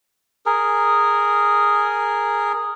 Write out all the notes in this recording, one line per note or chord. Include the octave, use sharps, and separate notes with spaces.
G#4 A#4